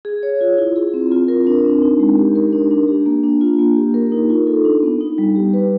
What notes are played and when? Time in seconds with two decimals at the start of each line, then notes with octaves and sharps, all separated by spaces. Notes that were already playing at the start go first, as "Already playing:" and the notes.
0.05 G#4
0.23 C#5
0.41 F4
0.58 E4
0.76 G#4
0.94 C4
1.12 F4
1.28 A#4
1.47 D4
1.64 C4
1.82 D#4
2.00 G#3
2.18 G4
2.35 A#4
2.53 D4
2.71 D4
2.88 G4
3.06 A#3
3.24 D4
3.41 F4
3.59 A#3
3.76 G4
3.94 A#4
4.12 D#4
4.30 F4
4.47 A4
4.65 D4
4.83 B3
5.01 D#4
5.18 G3
5.36 G4
5.54 B4